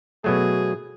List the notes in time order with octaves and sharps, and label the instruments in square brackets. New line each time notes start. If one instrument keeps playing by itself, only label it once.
[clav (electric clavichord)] B2 F#3 A3 [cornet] G#4